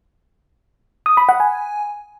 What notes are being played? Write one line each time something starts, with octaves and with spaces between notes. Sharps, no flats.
D#6
B5
F#5
G#5